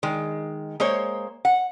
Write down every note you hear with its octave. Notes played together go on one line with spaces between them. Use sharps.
D#3 G#3
G#3 A#3 C5 C#5
F#5